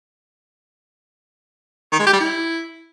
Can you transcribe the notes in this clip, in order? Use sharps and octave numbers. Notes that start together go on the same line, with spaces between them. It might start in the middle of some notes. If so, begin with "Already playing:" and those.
D#3
G#3
G4
G3
E4